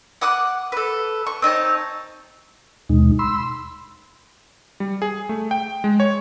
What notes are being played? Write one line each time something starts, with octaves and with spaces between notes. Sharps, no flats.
F#5 D6 D#6 F#6
A4 B4
C#6
C4 D#4 C#5 A5
D#2 B2 G#3 D#4
B5 C6 E6
G3
G#4
A3
G5
G#3
C#5